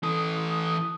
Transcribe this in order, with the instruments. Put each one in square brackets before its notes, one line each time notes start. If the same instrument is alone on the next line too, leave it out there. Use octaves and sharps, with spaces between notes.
[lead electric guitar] E3 A4 [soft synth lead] D#6